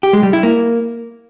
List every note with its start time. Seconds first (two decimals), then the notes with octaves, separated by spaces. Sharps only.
0.03 G4
0.13 G#3
0.23 G3
0.33 E4
0.43 A#3